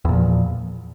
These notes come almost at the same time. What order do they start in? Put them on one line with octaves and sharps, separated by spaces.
E2 A#2 F3